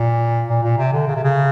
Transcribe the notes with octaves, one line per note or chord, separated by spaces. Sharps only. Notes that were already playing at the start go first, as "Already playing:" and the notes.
Already playing: A#2
A#2
A#2
C3
D3
C#3
C3
C#3